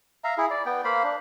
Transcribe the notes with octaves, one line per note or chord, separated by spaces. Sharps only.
E5 F5 A#5
E4 G#4
D5
B3 G5
A#3 C5 F5 B5
D4